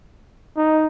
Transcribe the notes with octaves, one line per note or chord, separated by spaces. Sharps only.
D#4